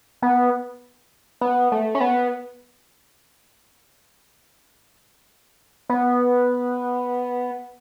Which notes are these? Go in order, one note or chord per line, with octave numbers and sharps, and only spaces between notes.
B3
B3
A3
C#4
B3
B3